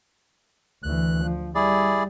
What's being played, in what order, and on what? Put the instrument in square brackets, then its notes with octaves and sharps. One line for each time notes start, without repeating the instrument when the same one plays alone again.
[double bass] D2 E3 [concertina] F#6
[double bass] F3
[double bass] G3 [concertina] E4 G#4 D5